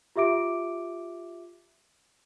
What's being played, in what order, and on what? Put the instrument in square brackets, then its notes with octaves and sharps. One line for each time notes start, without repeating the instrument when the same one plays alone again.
[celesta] F4 G4 E5 D6 D7